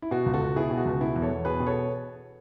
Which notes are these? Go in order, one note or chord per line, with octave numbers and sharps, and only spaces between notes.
E4
B2 F#4
C#2
F#4 A4
C#2
B2 E4 G#4
B2
F#4
C#2
B2 E4
E2
A4 C#5
E2
B2 G#4 B4
B2
A4 C#5